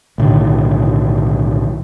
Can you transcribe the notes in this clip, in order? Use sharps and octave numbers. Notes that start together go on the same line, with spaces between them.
B1 A2 D3 D#3